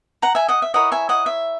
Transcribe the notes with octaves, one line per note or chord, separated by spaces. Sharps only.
F#5 A#5
E5 G#5
D#5 F#5
E5
E4 A#4 C#5 D#5 F#5
E5 G#5
D#5 F#5
E5